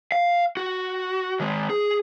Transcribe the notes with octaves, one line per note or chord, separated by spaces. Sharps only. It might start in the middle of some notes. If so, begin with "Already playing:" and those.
F5
F#4
D#3 G#3
G#4